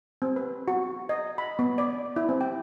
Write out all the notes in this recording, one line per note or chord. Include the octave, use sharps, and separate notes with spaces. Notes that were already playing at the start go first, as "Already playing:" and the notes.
C4
B4
F#4
D#5
B5
B3
D5
E4
C4
G5